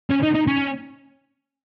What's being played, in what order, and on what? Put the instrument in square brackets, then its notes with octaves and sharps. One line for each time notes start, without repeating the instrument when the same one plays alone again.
[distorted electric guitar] C#4
D#4
D#4
C#4